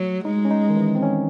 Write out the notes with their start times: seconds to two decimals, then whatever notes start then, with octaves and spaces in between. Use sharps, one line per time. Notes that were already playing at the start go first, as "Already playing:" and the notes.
Already playing: F#3 A3
0.25 G#3 D#4
0.45 C#4
0.51 D#4
0.70 D#3
0.77 E3
0.95 C4
1.03 C#4